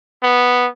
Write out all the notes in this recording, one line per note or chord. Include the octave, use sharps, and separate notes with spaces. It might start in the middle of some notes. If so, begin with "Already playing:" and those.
B3